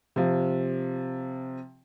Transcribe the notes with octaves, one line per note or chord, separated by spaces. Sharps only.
C3 F3